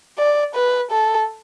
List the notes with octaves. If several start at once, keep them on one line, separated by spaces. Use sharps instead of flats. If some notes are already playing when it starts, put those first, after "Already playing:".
D5
B4
A4